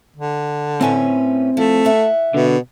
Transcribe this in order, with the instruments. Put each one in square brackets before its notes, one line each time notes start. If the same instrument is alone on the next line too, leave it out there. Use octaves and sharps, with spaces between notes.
[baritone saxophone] D3
[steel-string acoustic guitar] A2 C#4 B4 [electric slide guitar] C4 G#5
[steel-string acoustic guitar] F3 [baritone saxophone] A3
[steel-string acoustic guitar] E5 F#5
[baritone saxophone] B2 [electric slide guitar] D3